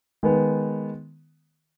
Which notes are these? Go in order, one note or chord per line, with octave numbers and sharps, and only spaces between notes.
D#3 G#3 B3